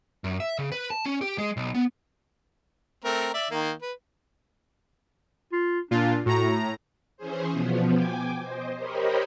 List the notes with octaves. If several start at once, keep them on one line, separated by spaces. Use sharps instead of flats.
F#2
E5
C#3
B4
A5
C#4
G4
G#3
B1
B3
A3 C4 A#4
D5 E5
D#3 A#3
B4
F4
A#2 D4 F4
A2 F#4 A#5
E3 C#4 G#4 C5
B2 F3 B3
G5 G#5 D6
C5 D#5
G4 A#4 C5 C#5 D#5 B5